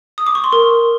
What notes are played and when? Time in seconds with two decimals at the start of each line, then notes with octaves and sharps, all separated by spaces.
0.18 D#6
0.27 D6
0.35 C#6
0.44 C6
0.53 A#4